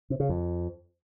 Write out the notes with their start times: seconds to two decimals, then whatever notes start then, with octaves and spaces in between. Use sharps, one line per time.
0.10 C3
0.20 C#3
0.29 F2